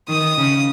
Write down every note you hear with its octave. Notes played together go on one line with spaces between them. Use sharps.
D#3 D#6
C#3